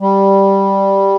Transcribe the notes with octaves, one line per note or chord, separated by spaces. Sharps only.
G3